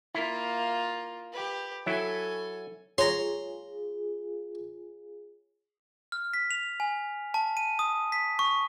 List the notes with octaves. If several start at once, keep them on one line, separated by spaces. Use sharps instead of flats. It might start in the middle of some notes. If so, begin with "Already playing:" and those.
A#3 E4 F4
G4 B4
F#3 E4 A4 G#5
F4 G#4 C#5 A#5 C6
F6
B6
F7
G#5
A5
D#7
D#6
B6
C#6